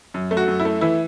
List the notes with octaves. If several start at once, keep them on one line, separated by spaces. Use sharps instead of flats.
F#2
A3
F#4
F#2
E4
A3
E3 E4